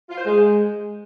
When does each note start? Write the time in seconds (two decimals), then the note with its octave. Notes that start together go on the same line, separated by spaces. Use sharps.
0.10 F4
0.18 C5
0.25 G#3